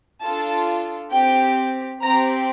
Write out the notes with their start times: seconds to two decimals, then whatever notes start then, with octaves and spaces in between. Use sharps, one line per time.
0.24 D4 F4 A4 A5
1.13 C4 G4 G5
2.03 C4 A#5
2.07 G4